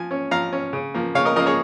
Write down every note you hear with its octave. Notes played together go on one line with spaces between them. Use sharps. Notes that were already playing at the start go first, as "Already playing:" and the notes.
Already playing: F3 G#5
C#4
F3 F5 A#5
C#4
C#3
F3 A#3
C#3 C#5 F5
A#4 D#5
F3 A#3 A#4 D#5
G#4 C#5